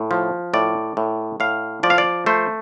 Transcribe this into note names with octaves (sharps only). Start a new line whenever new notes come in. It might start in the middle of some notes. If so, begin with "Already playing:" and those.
Already playing: A2
F3
A2 D5
A2
A2 F5
F3 D5
F5
D5
A3 C5